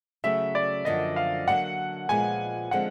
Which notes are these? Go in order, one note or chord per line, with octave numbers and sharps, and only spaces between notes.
C#3 F#3 A3 E5
D5
F#2 D3 F3 A#3 D#5
F5
D3 F#3 A#3 D4 F#5
A#2 F3 G#3 B3 G#5
D3 F3 G#3 C4 F#5